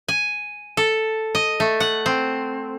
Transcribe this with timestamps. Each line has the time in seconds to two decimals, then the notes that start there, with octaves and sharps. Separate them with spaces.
0.08 G#5
0.77 A4
1.35 D#5
1.60 A3
1.80 F#5
2.06 C4